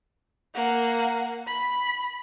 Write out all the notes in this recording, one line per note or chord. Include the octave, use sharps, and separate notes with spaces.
A#3 F#5
B5